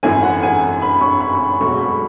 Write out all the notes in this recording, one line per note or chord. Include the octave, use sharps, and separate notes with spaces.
G#1 F#2 E3 A3 E4 G#5
F#5
G#5
B5
C#6
B5
C#6
E1 E2 B2 F#3 A3 C#6
B5